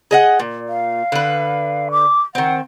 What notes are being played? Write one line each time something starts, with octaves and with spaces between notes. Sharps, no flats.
G#4 D#5 F#5
A#2
F5
D3 B4
D6
D#3 C4 F#5